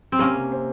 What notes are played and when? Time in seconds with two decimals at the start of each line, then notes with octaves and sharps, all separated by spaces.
0.12 C4
0.19 C3 A#3 C#4
0.35 C3
0.52 C4